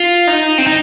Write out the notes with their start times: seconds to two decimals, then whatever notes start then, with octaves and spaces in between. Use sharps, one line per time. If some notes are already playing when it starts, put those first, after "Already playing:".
Already playing: F4
0.27 D#4
0.58 C4
0.67 D#4